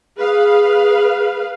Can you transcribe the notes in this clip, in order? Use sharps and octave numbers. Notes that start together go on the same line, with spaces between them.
G#4 B4 F5